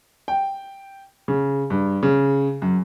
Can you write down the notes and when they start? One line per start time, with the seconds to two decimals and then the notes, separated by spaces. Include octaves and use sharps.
0.28 G5
1.28 C#3
1.70 G2
2.03 C#3
2.62 F#2